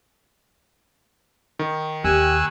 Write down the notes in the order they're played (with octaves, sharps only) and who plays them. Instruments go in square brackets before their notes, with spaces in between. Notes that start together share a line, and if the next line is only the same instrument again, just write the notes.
[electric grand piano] D#3
[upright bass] D#2 [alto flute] G4 [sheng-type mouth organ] G#5 E6 F#6